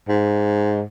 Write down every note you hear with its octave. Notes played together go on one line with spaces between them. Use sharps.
G#2